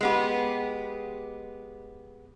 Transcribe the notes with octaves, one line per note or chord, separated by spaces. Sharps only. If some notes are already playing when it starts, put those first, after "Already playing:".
G#3 B3 G4